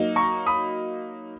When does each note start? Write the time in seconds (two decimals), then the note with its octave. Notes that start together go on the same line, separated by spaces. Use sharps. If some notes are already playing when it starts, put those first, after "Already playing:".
Already playing: F#3 A#3 D#4
0.16 A#5 C#6
0.46 B5 D#6